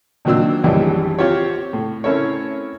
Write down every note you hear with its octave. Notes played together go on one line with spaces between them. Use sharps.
A#2 D#3 F#3 C4 D4 E6
A#1 F#2 D#3 E3 G3
C4 F4 G4 C#5
A2
C4 C#4 E4 A4 A#4 C#5